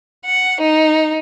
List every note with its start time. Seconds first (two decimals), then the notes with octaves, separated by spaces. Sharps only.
0.23 F#5
0.59 D#4